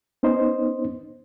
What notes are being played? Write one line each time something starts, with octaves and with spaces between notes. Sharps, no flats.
B3 C#4 D#4 C5 D#5